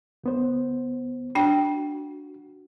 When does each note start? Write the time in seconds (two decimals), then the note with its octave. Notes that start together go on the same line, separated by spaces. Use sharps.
0.24 D2 B3 C5
1.35 D4 F#4 G5